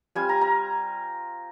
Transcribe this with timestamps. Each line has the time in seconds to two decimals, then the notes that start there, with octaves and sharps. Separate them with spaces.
0.15 G3 C4 F4 G#5
0.29 A#5
0.41 A#5